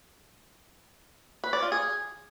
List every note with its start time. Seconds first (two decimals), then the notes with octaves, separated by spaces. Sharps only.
1.44 B4
1.53 D5
1.62 F4
1.72 G#4